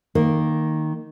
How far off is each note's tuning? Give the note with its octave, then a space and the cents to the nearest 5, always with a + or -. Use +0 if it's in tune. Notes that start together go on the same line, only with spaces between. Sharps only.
D#3 +0 A#3 -5